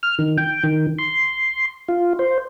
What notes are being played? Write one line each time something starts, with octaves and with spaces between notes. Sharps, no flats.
F6
D#3
G5
D#3
C6
F4
C5